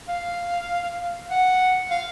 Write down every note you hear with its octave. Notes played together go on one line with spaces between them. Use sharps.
F5
F#5
F5